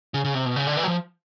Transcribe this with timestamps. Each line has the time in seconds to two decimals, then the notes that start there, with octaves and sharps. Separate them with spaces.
0.14 C#3
0.24 C#3
0.35 C3
0.46 B2
0.56 C#3
0.67 D3
0.77 E3
0.83 F#3
0.88 F3